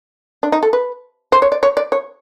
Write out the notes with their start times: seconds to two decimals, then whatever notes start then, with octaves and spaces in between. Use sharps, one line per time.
0.43 D4
0.52 D#4
0.63 A4
0.73 B4
1.32 C5
1.42 C#5
1.52 D5
1.63 C#5
1.77 D5
1.92 C#5